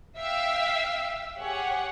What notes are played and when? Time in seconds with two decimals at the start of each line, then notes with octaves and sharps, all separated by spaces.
0.17 E5 F5 G5 E6
1.39 G4 G#4 C#5 F#5 G#5